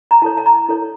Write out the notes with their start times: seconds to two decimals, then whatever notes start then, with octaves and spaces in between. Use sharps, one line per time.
0.11 A#5
0.22 E4 A4 C#5 A5
0.37 A5
0.46 A#5
0.69 E4 A4 C#5